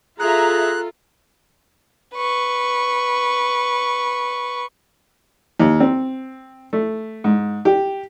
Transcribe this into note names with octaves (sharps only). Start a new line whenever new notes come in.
F4 G#4 A4 E5 A#5 F#6
B4 C#6
D#2
C4
A3
G#2
G4